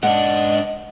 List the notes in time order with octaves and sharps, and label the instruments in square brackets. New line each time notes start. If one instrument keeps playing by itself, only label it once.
[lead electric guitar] G#2 D4 [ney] D#5 [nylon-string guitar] F#5